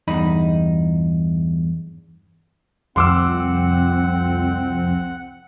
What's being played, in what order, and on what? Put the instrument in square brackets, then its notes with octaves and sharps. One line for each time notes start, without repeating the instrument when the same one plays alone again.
[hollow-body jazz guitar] E2 G2 D#4 B5
[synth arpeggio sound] C2 F2 F3 [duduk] C4 [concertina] F#5 [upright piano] C6 D6 E6